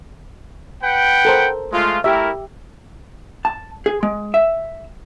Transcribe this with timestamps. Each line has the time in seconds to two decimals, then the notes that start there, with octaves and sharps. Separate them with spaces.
0.83 B4 F#5 G5
1.25 A4 A#4 C5
1.73 G#3 A3 F4
2.04 A3 E4 G4 A#4 E5
3.45 A5
3.86 G#4
4.03 G#3
4.34 E5